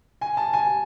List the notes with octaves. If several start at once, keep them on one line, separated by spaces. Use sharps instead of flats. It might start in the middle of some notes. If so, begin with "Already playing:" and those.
G#5
A5
G#5